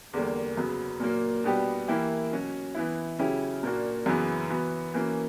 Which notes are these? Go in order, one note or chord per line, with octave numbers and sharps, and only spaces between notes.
E2 D3 G3 A#3
F#2 C#3 F#3 B3
A#2 F#3 A#3
B2 G3 B3 D4 G4
E3 A#3 E4 G4
B2 F#3 C#4 F#4
E3 B3 E4
C#3 F#3 C#4 E4 G4
A#2 A#3 D4 F#4
F#2 C#3 E3 B3
E3 B3 F#4
E3 A#3 C#4 F#4